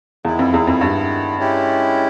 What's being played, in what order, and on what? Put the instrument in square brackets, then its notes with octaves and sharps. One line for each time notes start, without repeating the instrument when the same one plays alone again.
[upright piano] E2 [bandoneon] D#3 G#3 B3 E4
[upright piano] F2
E2
F2
G2
[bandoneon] G#3 C#4 E4 G4